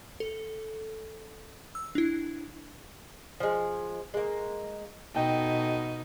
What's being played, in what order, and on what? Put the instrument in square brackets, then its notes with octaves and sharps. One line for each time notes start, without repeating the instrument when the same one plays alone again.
[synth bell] A4
E6
D4 E4
[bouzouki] F3 G#3
G#3 A#3
[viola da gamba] B2 D#4 [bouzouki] A4 G5